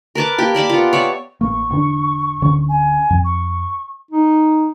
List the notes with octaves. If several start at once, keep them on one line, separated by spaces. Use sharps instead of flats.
A#4 B4 A5 D6
A#3 G4
A#4 D5 A5 B5
B3 F4
C#5 D5 E5
A1 A#3 C#6
E1 D3 D4
D1 D3 C#4
G#5
F2
C#6
D#4